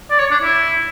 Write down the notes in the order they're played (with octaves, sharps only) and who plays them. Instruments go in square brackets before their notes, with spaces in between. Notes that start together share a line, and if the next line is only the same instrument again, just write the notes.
[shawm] D5
C#5
D4
E4